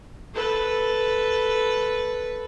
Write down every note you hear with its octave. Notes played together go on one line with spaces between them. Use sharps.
A4 B4